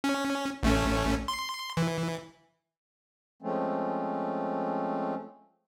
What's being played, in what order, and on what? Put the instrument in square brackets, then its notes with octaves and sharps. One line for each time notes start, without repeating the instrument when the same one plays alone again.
[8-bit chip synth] C#4
A1 A3 C#4
C6
E3
[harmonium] F3 G#3 A3 C4 C#4